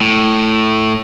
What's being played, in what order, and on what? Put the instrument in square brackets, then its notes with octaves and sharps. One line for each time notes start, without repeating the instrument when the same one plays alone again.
[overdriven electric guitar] A2